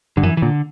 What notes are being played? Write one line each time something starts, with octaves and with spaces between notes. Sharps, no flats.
G2 D3
F#2 E3
E3
A#2 D3